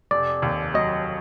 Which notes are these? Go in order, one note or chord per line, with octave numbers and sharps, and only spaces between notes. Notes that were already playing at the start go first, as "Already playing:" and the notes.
F1 D5
D#2
F#3 D#5